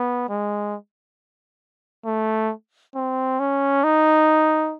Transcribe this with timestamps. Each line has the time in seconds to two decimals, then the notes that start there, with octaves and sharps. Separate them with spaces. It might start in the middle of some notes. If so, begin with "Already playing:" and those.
Already playing: B3
0.29 G#3
2.06 A3
2.95 C4
3.40 C#4
3.84 D#4